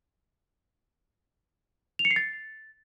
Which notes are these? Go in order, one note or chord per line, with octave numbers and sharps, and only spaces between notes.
F7
C#7
C7
A6